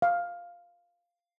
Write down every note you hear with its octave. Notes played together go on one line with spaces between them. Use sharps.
F5